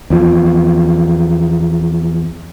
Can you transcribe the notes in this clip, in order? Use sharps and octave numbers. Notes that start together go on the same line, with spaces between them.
E2 F3